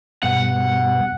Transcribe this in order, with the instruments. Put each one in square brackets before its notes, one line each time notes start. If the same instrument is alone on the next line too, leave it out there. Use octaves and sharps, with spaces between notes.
[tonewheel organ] G2 B2 [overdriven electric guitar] F#5